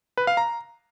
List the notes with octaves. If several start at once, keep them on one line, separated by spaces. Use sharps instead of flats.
B4
F5
A#5